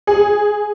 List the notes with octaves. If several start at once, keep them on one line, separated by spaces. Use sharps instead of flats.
G#4